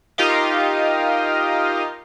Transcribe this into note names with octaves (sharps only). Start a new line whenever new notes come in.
D#4 F4 G4 A#4 D#5 F5